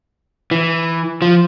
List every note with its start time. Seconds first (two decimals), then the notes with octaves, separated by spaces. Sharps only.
0.51 E3
1.22 F3